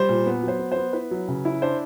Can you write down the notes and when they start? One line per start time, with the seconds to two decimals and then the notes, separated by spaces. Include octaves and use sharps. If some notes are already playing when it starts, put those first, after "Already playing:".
Already playing: G3 C5
0.09 A#2
0.26 B3
0.43 F#3 C5
0.59 B3
0.72 B3 C5
0.93 E4 B4
1.11 F#3
1.28 C#3
1.45 E4
1.62 D4 C5